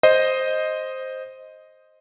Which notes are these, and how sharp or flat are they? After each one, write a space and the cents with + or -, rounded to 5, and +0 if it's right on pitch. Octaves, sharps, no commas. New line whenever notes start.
C5 +0 D#5 +0